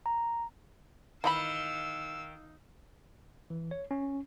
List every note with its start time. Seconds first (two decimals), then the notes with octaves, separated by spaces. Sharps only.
0.06 A#5
1.24 D#3 E3 F4 F5 B5 E6
3.50 E3
3.71 C#5
3.91 C#4